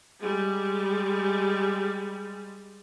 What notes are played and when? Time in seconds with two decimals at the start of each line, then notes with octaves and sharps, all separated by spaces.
0.21 G3 G#3